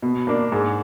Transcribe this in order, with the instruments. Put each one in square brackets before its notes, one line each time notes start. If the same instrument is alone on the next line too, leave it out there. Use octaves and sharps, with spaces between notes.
[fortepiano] B2
A#3 D4
G#2